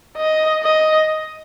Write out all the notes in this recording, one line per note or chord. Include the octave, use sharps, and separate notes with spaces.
D#5
D#5